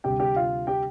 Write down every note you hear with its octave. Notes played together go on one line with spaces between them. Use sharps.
D2 C3 G3 G4 G5
G4 G5
F4 F5
G4 G5